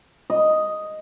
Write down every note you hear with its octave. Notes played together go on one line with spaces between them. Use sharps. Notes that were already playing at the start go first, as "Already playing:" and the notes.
D#5